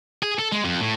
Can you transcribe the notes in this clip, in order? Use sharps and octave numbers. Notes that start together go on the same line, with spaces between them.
G#4
A4
G#3
F2
A2